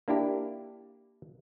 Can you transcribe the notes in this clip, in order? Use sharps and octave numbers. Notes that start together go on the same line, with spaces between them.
A#3 D4 E4 G4